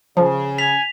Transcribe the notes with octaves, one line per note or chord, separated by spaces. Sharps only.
C#3 F3
G#5 B6 F7